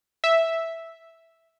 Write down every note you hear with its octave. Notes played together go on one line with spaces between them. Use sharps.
E5